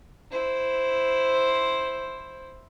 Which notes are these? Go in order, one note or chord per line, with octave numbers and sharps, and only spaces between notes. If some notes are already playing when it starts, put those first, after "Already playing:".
E4 C5